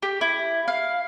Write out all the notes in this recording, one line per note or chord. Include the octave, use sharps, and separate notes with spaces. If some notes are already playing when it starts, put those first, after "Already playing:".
G4
E4
F5